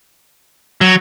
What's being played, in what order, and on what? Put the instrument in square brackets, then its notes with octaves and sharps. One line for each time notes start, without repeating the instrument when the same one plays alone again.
[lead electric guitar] F#3